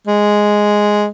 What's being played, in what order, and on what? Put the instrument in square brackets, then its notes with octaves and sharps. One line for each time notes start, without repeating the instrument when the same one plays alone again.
[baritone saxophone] G#3